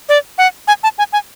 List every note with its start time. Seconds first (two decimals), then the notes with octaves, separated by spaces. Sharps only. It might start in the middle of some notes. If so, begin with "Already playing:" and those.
0.09 D5
0.38 F#5
0.68 G#5
0.83 A5
0.98 G#5
1.13 G#5